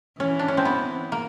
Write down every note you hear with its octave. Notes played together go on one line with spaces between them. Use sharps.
E3 C#4
D4
C#4
C4
B3
A#3